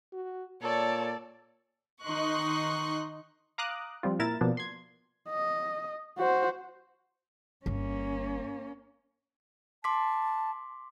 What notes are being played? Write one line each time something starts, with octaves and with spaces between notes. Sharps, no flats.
F#4
A#2 A4 C#5 D5 A5
D#3 D#4 D#5 C6 C#6 F#6
F5 A#5 D6 D#6 F#6
F3 G3 C4 F4
A#2 E4 A#4 A6 E7
B2 F3 A#3 B3 D4
C6 G#6
D#5
F#4 C5
G1 A#3 C#4
A5 C6 D6 B6